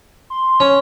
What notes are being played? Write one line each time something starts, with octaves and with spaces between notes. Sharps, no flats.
C6
C#4